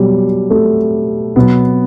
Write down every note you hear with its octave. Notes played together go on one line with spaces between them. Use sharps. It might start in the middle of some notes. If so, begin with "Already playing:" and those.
Already playing: B2 F#3 G3
A3
B2 F#3 B3